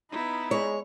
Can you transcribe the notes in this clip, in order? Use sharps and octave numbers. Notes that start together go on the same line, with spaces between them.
B3 D#4 E4 B5
G#3 C#5